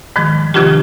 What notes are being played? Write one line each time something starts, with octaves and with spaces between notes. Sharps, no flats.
G#2 D#3 F3 G#3
C3 D#3 F3 D4 F4 G4